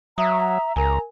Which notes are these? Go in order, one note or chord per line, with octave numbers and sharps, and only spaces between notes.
F#3 E5 A#5 D#6
C#2 A#4 G#5 A#5